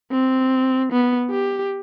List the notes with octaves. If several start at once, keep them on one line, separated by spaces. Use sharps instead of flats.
C4
B3
G4